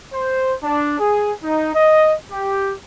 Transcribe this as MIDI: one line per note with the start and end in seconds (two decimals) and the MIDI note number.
0.14 0.55 72
0.63 0.99 62
0.99 1.33 68
1.44 1.74 63
1.74 2.14 75
2.31 2.73 67